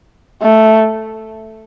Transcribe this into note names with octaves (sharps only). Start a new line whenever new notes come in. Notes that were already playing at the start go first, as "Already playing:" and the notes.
A3